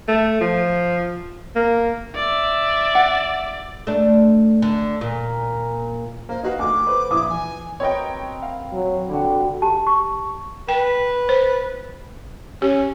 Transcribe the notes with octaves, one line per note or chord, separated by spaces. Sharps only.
A3
F3
A#3
D5 E5
F#5
A3 D4
D3
A#2
A#3 C5
D#4 F#4 B4 F5
D2 D6
B4 C5
A#1 E4 D#6
E3 G#5
C4 A#4 B4 C#5 D#5 G5
F5
F#3
D3 G3 F#4
G4 A5
C#6
B4 G5
C5
C#4 G4